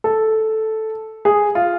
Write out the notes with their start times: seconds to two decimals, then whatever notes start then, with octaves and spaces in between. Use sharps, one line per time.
0.04 A4
1.25 G#4
1.55 F4